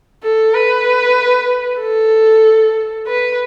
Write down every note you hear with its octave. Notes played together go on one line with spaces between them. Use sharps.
A4
B4
A4
B4